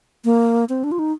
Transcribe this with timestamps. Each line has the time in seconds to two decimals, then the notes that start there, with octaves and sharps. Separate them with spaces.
0.25 A#3
0.69 C4
0.84 D4
0.92 F4
0.99 D#4